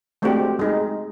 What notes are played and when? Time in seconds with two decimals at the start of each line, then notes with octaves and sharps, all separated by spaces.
0.22 G#3 A3 C4 D4 F#4 G4
0.59 G#3 D#4